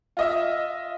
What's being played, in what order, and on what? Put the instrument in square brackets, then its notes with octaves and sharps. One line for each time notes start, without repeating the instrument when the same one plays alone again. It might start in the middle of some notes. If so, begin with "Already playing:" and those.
[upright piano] F4 D#5 E5